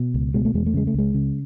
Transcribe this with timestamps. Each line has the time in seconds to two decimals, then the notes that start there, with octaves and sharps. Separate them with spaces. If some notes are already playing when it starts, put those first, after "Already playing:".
Already playing: B2
0.14 C#2
0.34 B2 G#3
0.45 A3
0.54 E2 G#3
0.66 A3
0.74 C#3 G#3
0.87 A3
0.94 C#2 G#3
1.14 C#3